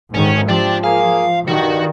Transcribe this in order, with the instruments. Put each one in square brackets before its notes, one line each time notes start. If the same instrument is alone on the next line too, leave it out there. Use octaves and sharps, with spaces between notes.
[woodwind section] D2 [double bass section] G#2 D#3 [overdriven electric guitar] C#4
[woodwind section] C3 C4 G4 [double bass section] F3 [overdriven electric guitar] D4 D5
[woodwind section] A#3 G#4 [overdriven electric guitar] F5
[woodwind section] G2 [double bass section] D#3 [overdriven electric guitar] F#4